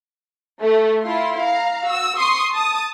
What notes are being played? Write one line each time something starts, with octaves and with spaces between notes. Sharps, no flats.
A3
E4 F4 C6
F5 A#5
F#4 E6
C6 C#6 D#6 C7
A5 D#6